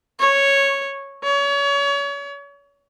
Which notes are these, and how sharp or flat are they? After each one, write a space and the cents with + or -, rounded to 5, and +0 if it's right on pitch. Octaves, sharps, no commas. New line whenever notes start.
C#5 -5
C#5 +35